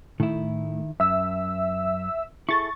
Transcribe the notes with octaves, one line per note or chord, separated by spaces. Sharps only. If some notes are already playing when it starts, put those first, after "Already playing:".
A2 D#3 E4
F#2 E5 E6
E4 G#4 A4 C#6 A6